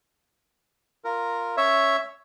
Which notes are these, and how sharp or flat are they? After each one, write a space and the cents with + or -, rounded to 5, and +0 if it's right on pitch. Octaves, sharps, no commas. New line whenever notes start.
F4 +0 A#4 -5
C#4 +0 C#5 +0 E5 +0